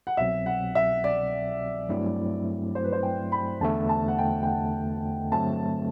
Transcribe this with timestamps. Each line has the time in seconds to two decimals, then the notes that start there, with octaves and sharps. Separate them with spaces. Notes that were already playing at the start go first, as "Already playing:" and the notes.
0.07 F#5
0.17 C2 B2 F#3 C4 E5
0.46 F#5
0.75 E5
1.04 D5
1.89 G2 F#3 A3 C4 E4
2.75 C5
2.84 B4
2.92 C5
3.03 G5
3.32 B5
3.61 E2 D3 A3 A5
3.89 A5
4.08 F#5
4.18 G5
4.43 G5
4.46 F#5
5.32 G2 D3 F#3 A3 C4 A5